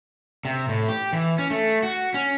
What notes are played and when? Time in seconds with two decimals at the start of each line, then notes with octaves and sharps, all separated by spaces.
0.45 C3
0.69 A2
0.88 G4
1.13 E3
1.38 C#4
1.50 A3
1.83 F#4
2.14 C#4